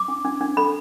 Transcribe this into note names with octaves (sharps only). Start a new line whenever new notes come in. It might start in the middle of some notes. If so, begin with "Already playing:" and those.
Already playing: D6
D4
D4
D4
A4 B5